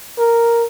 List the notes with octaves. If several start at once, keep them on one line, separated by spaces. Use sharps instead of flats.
A#4